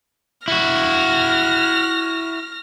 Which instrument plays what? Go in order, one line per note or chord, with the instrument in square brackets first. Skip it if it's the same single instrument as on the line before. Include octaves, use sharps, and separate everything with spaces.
[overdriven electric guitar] E4 F#4 [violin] F6 A#6